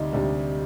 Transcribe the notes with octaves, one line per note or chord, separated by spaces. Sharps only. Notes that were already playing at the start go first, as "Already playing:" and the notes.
Already playing: D2 C3 G3 D#4 D5
D2 C3 G3 D4